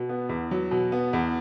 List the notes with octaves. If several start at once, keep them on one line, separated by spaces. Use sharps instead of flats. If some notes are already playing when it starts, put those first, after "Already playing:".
Already playing: B2
B3
E2
F#3
B2
B3
E2